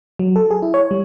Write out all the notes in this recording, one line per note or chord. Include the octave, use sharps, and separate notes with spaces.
F#3
A4
G#4
E4
C#5
G3